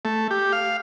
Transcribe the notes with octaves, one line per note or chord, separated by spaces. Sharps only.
A3
G4
F5